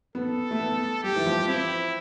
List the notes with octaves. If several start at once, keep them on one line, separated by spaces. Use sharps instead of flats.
B3 A4
A3
B3
G3 G4
E3
F3
C4 E4